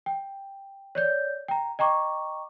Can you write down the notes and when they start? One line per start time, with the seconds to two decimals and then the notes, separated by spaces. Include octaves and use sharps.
0.06 G5
0.95 C#5 D5 G6
1.48 G5 A#5
1.79 D#5 G5 A#5 C#6 D6